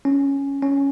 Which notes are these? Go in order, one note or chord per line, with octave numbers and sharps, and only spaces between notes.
C#4
C#4